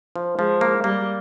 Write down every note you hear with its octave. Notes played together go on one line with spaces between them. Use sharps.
F3
F3 G#3
A#3
G3 A#3